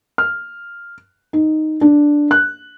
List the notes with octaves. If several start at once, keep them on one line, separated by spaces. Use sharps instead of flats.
F6
D#4
D4
F#6